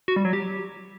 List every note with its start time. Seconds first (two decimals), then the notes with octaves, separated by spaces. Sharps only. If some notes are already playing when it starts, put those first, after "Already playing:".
0.08 F#4
0.16 G3
0.25 F#3
0.33 G4